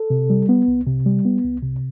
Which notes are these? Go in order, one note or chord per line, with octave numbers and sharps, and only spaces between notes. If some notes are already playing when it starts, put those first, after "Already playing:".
Already playing: A4
C3
G3
B3
C2
C3
G3
B3
C2
C3